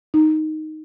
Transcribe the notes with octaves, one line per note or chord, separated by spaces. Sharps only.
D#4